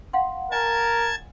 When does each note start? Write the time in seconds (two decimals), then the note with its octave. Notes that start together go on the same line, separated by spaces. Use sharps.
0.13 F5 F#5 C6
0.52 A#4 D#5 G#5 A5 G#6